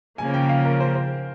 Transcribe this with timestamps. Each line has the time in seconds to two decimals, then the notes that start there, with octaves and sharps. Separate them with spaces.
0.18 C#3 F3 A#3 G#5
0.34 G5
0.49 F5
0.65 A#4
0.80 C5
0.95 C5